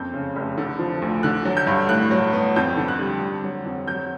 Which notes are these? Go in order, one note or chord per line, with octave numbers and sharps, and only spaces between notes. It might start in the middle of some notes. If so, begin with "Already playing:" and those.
Already playing: F#1 F2 G6
C#3
F1
D3
F3
D2
D3 F#6
F#3
G6
G2
A2 F#6
F#3
B3
F2 G6
D3
F#6
G3
D3
F#3
F2
F#3 G6